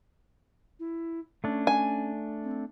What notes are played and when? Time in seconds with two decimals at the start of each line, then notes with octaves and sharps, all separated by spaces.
0.80 E4
1.44 A3 C#4 D4
1.67 G#5
2.44 C4